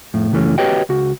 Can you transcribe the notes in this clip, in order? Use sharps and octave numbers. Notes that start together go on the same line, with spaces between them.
F2 A2
C#2 F#2 E3 A3 C#4
F#4 G4 B4 C#5 D#5 G5
C#2 F#4